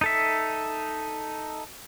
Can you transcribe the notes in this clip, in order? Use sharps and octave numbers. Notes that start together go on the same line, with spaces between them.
D#4 A4 E5